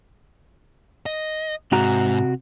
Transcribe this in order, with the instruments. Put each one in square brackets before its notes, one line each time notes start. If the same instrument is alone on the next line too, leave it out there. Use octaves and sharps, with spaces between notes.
[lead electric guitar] D#5
[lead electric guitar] G#2 [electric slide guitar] C3 F#4 A#5